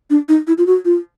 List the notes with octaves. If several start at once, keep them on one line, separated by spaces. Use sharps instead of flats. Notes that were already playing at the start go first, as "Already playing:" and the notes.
D4
D#4
E4
F4
F#4
F4